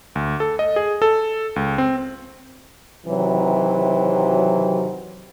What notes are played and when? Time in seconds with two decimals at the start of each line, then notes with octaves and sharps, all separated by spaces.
0.15 D2
0.40 A4
0.59 D#5
0.76 G#4
1.02 A4
1.56 C#2
1.78 C4
3.06 C3 D#3 E3 F#3